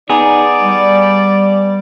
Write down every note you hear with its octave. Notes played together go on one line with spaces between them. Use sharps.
B3 D#4 G#4 D5
G3